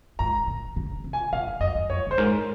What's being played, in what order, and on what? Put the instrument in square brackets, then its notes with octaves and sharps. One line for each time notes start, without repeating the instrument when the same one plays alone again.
[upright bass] G#2 [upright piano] A#5
[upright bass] A#2
C#3
C3
[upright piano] G#5
[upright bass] A#2 [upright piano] F5
[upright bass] G#2
[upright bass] F#2 [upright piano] D#5
[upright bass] F2
[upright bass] F#2 [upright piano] C#5
[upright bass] F#2 [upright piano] C5
[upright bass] G#2 [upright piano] A#4